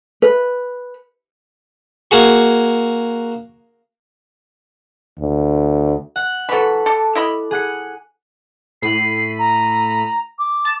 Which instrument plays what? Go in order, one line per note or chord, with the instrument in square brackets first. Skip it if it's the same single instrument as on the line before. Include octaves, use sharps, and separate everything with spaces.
[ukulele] B4
[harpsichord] A#3 F#4 G#4 C#6
[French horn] D2
[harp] F#5
[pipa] E3 F#3 [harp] A4 B5
[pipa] A4 [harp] D6
[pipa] E4 D#5 B5
[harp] G#4 F#5 C#7
[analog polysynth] A2 B5 D#7 [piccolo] C7
[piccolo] A#5
[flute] D6
[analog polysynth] A5 [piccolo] A6